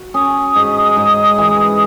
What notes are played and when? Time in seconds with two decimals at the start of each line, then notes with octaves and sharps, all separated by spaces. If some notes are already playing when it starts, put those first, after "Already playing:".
Already playing: F#4
0.14 C#4 D#6
0.56 G#2
0.97 G#2
1.38 E3